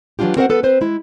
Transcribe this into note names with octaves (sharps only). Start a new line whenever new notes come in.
E3 F#3 A#3 D4 F4 G4
C4 F#4 A#4 C5 E5 F#5
B3 A4 B4
C4 B4 C5
G#3 E4